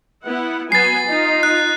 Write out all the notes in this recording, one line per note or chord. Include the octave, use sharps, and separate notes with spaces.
B3 E4 F#5
F#3 B3 G#5 A6 C7
D#4 F4
F#6